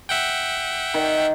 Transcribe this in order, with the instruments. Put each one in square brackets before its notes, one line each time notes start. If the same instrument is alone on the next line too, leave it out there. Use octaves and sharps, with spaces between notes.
[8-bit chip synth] E5 F#5 G5
[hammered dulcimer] D#3